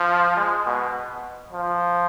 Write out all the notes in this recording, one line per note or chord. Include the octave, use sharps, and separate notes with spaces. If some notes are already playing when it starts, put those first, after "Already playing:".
Already playing: F3
G#3
B2
F3